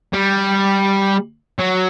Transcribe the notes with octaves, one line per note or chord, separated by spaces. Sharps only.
G3
F#3